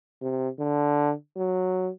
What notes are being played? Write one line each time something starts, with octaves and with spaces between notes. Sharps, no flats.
C3
D3
F#3